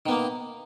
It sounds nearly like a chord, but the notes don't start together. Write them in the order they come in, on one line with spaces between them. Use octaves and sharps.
D#3 B3 A#3